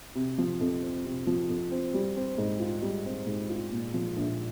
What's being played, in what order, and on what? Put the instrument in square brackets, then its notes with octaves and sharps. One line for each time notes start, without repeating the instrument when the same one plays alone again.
[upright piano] C3
F3
F2
C4
C3
F3
F2
C4
G3
C4
G#2
F4
G3
C4
G#2
F4
A#2
F3
A#1